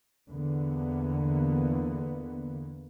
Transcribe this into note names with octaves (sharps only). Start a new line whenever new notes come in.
E2 D3 A#3 B3